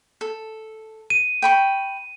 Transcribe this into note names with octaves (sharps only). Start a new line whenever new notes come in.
A4
D#7
G5 B5 C#6